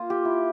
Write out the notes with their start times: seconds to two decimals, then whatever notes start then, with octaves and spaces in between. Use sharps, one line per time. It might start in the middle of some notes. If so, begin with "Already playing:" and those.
Already playing: A#3 F4
0.10 G4
0.25 E4